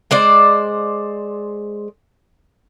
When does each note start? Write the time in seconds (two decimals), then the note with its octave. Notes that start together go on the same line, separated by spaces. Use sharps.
0.11 G#3 C5 D5